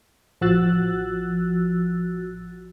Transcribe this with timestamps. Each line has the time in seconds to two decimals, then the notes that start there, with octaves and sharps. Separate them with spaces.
0.41 A1 F3 F#4 E6 F#6 A6